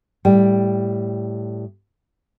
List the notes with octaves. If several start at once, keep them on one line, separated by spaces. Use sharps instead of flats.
A2 G3 G5